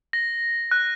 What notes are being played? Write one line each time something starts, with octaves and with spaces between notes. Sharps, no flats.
A#6
F#6